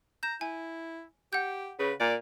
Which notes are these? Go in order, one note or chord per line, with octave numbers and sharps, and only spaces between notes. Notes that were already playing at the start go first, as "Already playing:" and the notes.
A#5 G6 E7
E4 G#5
G4 F#5 G6
C#3 B4
A#2 D5